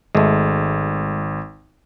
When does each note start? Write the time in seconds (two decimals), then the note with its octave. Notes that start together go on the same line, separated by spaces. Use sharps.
0.15 G#1 G#3 A3